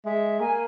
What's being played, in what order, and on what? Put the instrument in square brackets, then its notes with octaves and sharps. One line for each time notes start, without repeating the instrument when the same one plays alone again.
[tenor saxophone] G#3 [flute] E5
[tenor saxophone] A#3 [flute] G#5